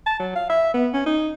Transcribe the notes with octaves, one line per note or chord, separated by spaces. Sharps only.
A5
F#3
F5
E5
B3
C#4
D#4